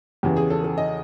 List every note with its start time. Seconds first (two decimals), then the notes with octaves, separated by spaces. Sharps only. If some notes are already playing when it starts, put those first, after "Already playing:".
0.23 E2 C#3 E3 G4
0.37 G#4
0.50 A4
0.64 A4
0.78 D#5